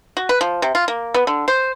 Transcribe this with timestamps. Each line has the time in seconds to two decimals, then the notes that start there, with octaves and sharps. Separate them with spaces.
0.17 F#4
0.29 B4
0.41 F3
0.62 C3
0.75 F4
0.88 A#3
1.14 B3
1.27 D3
1.48 C5